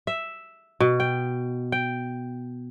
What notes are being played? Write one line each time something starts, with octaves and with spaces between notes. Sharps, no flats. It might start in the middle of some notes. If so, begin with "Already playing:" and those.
E5
B2
G5
G5